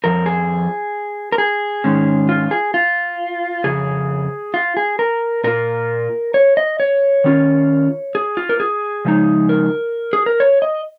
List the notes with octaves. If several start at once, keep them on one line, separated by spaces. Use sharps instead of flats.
F2 F3 A#4
G#4
A#4
G#4
G#2 D#3 G#3 C#4
F4
G#4
F4
F2 C#3 G#4
F4
G#4
A#4
A#2 A#3 F4 A#4
C#5
D#5
C#5
D#3 C#4 F4
G#4
F4
A#4
G#4
C#3 F3 G#3 D#4
A#4
G#4
A#4
C#5
D#5